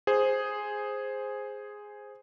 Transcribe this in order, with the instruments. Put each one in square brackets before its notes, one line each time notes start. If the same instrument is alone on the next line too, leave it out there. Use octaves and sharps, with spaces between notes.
[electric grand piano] G#4 C5